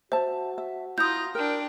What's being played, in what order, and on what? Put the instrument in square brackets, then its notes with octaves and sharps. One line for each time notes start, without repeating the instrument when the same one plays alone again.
[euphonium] F#4 [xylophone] C5 [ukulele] E5 A5
[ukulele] E5
[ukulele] E4 [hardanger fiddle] F4 A#5 [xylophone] D#6 G6
[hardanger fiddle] D4 G5 [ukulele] A#4